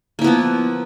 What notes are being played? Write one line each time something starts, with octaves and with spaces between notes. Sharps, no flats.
F3 A#3 B3 E4